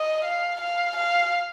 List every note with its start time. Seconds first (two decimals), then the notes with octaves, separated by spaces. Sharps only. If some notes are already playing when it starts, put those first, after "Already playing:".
Already playing: D#5
0.25 F5
0.61 F5
0.97 F5